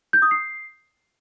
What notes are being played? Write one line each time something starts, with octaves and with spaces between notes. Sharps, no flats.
G6
D#6
C7